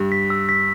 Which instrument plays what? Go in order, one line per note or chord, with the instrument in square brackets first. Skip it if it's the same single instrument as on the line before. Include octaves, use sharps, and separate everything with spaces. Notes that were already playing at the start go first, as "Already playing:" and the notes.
Already playing: [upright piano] G2
[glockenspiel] B6
E6
B6